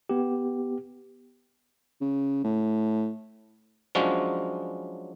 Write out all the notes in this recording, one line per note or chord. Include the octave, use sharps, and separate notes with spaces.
B3 G4
C#3
A2
F3 F#3 G#3 C#4 D4